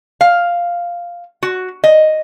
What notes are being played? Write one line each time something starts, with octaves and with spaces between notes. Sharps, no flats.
F5
F#4
D#5